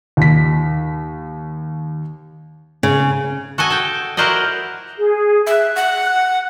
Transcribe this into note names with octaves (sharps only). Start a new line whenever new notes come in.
D#2 B6
C#3
F#4 A4 D#5 G#5
A4 G5
E4 F#4 A#4 C5 D5 D#5
G#4
E5 F#6
F#5